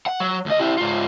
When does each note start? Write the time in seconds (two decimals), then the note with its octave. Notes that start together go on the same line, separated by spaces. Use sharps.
0.06 F#5
0.20 F#3
0.46 D2 D#5
0.60 E4 G4
0.78 G#2 F4